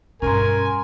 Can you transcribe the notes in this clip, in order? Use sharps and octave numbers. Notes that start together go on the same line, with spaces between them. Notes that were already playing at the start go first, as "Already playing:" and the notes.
G2 B2 C#4 A#4 G#5 A#5 C6